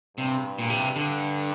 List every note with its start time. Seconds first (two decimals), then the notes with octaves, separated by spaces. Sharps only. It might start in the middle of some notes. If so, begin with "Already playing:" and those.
0.17 G2 C3
0.59 A#2
0.70 C3
0.95 G2 D3